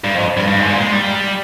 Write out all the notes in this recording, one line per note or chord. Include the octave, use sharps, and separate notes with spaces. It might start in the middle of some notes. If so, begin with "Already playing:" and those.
G2
F2
G2
G2
G#2
A#2
G#3
G3